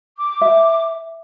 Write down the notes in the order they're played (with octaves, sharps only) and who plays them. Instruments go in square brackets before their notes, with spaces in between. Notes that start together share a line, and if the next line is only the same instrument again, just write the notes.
[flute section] D6
[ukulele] E5